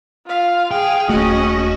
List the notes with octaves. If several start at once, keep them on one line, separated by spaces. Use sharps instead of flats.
F4 F5
G#4 F5 G5
D#1 A3 C#4 F#4 D#5